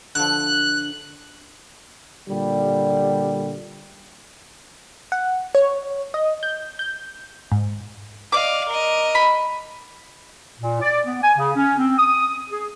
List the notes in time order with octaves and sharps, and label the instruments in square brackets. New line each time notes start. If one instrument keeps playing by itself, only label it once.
[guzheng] D3 F3 [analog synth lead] F#6
[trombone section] A#2 D3 G3
[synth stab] F#5
C#5
D#5
G6
G6
G#2
[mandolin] D5 D6 [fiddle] D#5 F5
[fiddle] A#4 D#5
[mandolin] B5
[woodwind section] A#2
D5
B3
G#5
C#3
C#4
C4
D#6
G#4